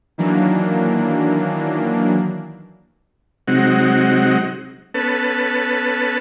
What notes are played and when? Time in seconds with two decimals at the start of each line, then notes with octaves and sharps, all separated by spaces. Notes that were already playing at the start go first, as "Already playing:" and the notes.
0.18 D#3 E3 F#3 A#3 D4
3.48 C3 F#3 G#3 C4 D#4 F#5
4.94 B3 C#4 A4 B4 A5